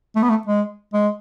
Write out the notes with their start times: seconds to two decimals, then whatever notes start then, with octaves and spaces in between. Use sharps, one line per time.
0.16 A3
0.23 B3
0.30 A3
0.47 G#3
0.94 G#3